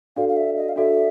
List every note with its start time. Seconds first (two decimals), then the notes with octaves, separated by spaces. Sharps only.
0.16 D4 F#4 A4 D5 F5
0.29 F5
0.37 E5
0.57 D#5
0.69 F5
0.76 D4 F#4 A4 D5 E5